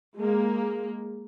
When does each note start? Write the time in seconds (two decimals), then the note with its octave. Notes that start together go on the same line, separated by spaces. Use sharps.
0.17 G#3 A#3